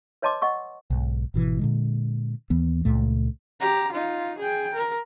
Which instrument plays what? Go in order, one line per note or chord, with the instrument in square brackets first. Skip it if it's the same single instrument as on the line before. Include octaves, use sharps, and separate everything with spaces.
[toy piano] B4 C#5 D#5 A5 C6 D6
D#5 F#5 C#6 E6
[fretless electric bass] B1 G#2
G#1 B2 E3
A#2 D3 G#3
D#2 E3 B3
C#2 A#2 A3
[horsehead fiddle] G4 A#5
D#4 F4
G#4 G5
A#4